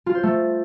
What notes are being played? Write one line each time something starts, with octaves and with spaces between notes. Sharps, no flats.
F4
C5
A3